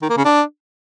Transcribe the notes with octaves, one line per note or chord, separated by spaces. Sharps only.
D#3
A#3
C#3
D4